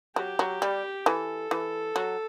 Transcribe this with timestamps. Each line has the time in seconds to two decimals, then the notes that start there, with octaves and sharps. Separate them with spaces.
0.16 F#3 G4
0.39 F#3
0.62 G3
1.06 E3 A4
1.51 E3
1.96 F#3